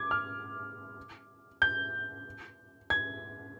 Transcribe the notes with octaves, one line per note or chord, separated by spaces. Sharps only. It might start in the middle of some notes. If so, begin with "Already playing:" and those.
Already playing: D6 G#6
F6
G6
G#6